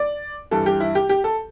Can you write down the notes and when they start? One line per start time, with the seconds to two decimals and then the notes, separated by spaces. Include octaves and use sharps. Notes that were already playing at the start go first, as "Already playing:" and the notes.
Already playing: D5
0.51 G2 E3 G3 A4
0.66 G4
0.80 E4
0.95 G4
1.09 G4
1.24 A4